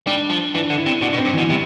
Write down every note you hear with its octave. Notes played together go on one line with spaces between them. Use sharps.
G3 D4
F3
E3 D4
D3
E4
C3
B2 D4
B2
C4
G2
B2 E3
C3 G3